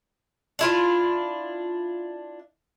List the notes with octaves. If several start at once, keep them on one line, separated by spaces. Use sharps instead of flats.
D4 E4 F4